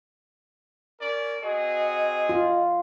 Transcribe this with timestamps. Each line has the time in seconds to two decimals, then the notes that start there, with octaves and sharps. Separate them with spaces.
1.01 C#4 A#4 D5
1.43 C4 F#4 G#4 D#5
2.29 F4